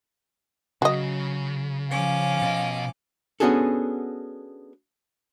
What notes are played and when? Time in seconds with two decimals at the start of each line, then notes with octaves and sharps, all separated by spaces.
0.82 C#3 F#3 F#4 D#5
1.90 F3 C#4 F5 D6
2.42 B2 D#5
3.40 B3 C#4 D4 F#4 G#4 A4